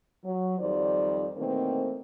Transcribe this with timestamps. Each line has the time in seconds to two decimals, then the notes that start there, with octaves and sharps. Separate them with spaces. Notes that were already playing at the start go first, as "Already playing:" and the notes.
0.24 F#3
0.59 F2 D#3 G3 C5 D5
1.37 B2 D#3 E3 A3 A#3 C4